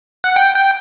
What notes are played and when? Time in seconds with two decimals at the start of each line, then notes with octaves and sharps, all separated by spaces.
0.24 F#5
0.36 G5
0.55 G5